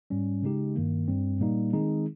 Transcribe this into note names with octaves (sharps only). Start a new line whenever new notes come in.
G#2 G3 C#4
C#3 G#3 D#4 G4
G2 D#3 A#3
G2 G3 C4
A#2 G3 A#3 D#4
D#3 G#3 C4 D#4 G#4